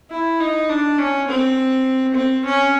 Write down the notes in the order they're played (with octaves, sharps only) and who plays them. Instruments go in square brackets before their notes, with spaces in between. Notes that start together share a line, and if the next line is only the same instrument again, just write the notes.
[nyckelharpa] E4
D#4
D4
C#4
C4
C4
C#4